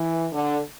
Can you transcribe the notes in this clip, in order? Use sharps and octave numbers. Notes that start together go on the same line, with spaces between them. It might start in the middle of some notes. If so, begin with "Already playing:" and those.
Already playing: E3
D3